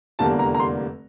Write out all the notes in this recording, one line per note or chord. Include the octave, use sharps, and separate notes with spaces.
F1 E2 D3 G3 A#3 A5
A#5
A#5
C6